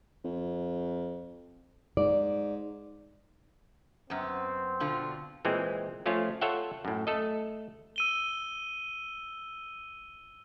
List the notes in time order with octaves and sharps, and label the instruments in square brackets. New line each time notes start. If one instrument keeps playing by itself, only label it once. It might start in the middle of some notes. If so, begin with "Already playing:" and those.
[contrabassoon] F2
[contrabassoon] G#2 [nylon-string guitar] D5
[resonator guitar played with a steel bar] F#2 B3 [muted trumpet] C4
[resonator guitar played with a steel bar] B2 D3 F4
[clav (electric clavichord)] A#2 E3 G#3 C4
F3 A3 C#4 F4 C#5
F4 A4 C#5 E5 F#5 G5
F#2 A2
A3 A4 D#5
[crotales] E6 D#7 G7